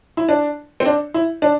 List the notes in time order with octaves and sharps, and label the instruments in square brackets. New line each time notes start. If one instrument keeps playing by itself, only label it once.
[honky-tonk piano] E4
D4
C4
D4
E4
D4